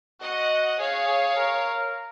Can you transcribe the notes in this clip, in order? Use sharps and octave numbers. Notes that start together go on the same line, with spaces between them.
F#4 D#5 F#5
G#4 C#5 F5
G#4
A#4